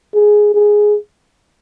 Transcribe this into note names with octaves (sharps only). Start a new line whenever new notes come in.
G#4
G#4